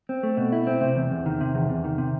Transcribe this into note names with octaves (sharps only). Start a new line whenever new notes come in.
C4
A3
B2
E4
C4
C3
E2
E2
D#3
C3
E2
E2
D#3
C3